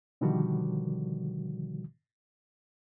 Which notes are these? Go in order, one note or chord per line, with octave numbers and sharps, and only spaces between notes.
B2 D3 D#3 F3 G3 F#4